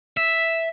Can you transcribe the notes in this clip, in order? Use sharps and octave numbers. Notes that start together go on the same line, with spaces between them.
E5